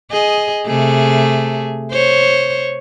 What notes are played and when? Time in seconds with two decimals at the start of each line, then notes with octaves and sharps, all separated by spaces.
0.12 G#4 D#5
0.66 C3 A3 G#4
1.92 C5 C#5